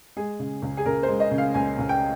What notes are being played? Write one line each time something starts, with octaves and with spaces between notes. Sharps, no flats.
G#3 G#4
C#3
C#2
G#4
C#2 A#4
C5
G#3
D#5
C#3
F5
C#2 G#5
C#2
G5